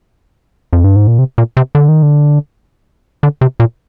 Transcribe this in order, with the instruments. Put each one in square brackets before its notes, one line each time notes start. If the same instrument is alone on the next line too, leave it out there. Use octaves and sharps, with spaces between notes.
[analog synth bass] F2
G2
G#2
A#2
C3
A#2
C3
D3
D#3
D3
D3
C3
A#2